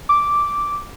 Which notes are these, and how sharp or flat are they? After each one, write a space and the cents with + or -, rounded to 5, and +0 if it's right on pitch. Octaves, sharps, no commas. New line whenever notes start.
D6 -5